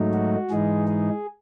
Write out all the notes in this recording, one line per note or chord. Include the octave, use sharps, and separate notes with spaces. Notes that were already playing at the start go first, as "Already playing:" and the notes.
Already playing: G#2 F#3 A3 D#4
F#4
G#2 E3 G#3 D#4 G#4
G#4